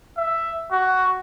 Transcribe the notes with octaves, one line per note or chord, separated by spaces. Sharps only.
E5
F#4